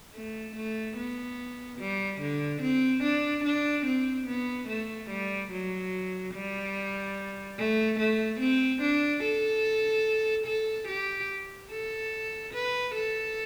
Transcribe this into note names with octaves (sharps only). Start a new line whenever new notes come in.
A3
A3
B3
G3
D3
C4
D4
D4
C4
B3
A3
G3
F#3
G3
A3
A3
C4
D4
A4
A4
G4
A4
B4
A4